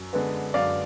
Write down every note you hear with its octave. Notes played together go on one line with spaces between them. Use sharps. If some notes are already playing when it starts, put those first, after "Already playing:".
Already playing: F#2
D3 G#3 B3
F#2 D5 F5